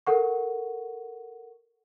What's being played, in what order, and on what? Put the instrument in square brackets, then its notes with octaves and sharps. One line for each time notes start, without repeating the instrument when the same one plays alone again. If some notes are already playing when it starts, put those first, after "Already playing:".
[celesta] A4 A#4 F#5 C#6